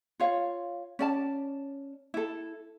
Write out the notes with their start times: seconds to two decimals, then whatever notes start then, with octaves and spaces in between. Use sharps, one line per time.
0.20 F4 C#5 F5
0.99 C#4 D5 A5
2.14 E4 A4